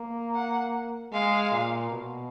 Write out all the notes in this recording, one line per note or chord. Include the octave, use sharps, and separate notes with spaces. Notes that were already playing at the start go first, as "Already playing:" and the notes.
Already playing: A#3
F#5
G#3 F5
A#2
B2